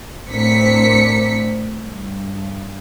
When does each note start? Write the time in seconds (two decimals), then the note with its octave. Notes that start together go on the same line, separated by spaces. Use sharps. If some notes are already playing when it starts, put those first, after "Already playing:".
0.30 A2 C4 D4 A#4 B6 C#7
1.85 G2